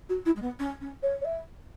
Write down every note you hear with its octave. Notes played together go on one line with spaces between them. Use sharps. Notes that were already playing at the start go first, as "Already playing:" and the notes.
F#4
E4
G#3
B3
C#4
C#4
C#5
C#5
E5